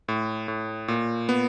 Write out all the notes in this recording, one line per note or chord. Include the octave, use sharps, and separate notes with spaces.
A2
A2
A#2
B3